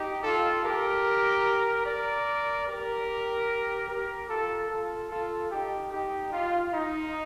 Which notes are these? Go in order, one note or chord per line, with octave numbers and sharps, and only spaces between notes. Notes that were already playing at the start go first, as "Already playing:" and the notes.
Already playing: D#4 G4
F4 A4
G4 A#4
A#4 D5
G4 A#4
G4 A#4
F4 A4
F4 A4
F4 A4
D#4 G4
D#4 G4
F4
D#4